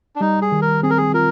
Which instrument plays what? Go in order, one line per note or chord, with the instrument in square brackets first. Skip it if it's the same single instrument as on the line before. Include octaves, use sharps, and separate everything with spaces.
[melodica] D4
[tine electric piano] G3 [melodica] D#4
[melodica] G#4
[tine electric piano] D#3
[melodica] A#4
[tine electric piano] C4 [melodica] G#4
[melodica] A#4
G#4
[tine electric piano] F4 [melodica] A#4